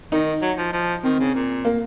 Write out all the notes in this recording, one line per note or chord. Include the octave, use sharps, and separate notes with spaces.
D#3 D#4
F#3
F3
F3
D#3 C4
C#3
A#2
A#3